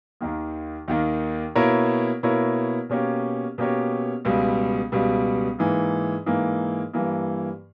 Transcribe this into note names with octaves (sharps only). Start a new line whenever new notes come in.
D#2 D#3 A#3
D#2 D#3 A#3
B2 A#3 E4 A#4 C#5
B2 A#3 E4 A#4 C#5
B2 A#3 C#4 G4 C#5
B2 A#3 C#4 G4 C#5
C#2 B2 G3
C#2 B2 G3
G#2 E3 A#3
G#2 E3 A#3
G2 E3 A#3